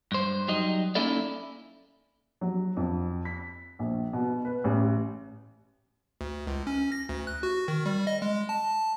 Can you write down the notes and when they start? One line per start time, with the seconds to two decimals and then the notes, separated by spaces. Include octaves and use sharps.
0.12 G2 C5
0.48 F#3 G3 D#4 D#5
0.95 A#3 C#4 D#4 E4 A4 D5
2.41 F#3
2.77 F2
3.25 B6
3.79 A#1
4.13 B2
4.45 B4
4.64 A1
6.21 D2
6.47 C#2
6.67 C#4
6.92 A#6
7.09 D2
7.27 F#6
7.43 F#4
7.68 D#3
7.86 G3
8.07 D#5
8.22 G#3
8.49 A5